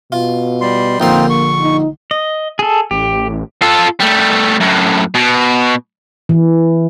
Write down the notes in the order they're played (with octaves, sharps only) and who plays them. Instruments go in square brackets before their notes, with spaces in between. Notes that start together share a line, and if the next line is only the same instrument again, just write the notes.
[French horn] B2 [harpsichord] F4
[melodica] G3 C6
[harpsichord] A#1 D3 C6 [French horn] A#3 [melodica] C4 D#4 F4
[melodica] C#6
[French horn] D#4
[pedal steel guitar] D#5
G#4 A4
[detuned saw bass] A1 [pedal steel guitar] G4
[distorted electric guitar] F4 A4
G3 A3
F#2 A2
B2
[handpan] E3